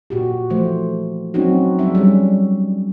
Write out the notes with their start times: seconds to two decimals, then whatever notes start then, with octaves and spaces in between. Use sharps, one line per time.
0.10 A#2 F#4 G4
0.50 E3 F3 A3 C5
1.34 F#3 C4 C#4 D#4 F#4
1.79 F#3 G#3 C#4 D4 E5
1.95 G3 C#4